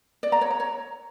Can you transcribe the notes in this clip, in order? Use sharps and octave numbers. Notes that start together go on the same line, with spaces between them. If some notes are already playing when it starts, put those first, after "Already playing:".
D5
A#5
C#5
A#5
C#5